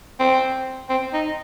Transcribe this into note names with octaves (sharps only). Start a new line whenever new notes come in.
C4
C4
D#4